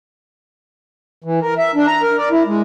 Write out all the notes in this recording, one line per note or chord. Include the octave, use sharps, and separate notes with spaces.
E3
A#4
E5
D4
A#5
A#4
D5
E4
G#3